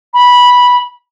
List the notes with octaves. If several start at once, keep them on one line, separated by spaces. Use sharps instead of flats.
B5